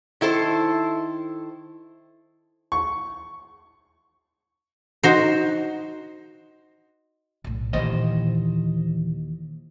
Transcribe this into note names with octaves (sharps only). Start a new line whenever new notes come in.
D#3 E4 A4 C5
C#6
D#4 F#4 C5
B1 A2
D#2 A#2 E3 C5 D#5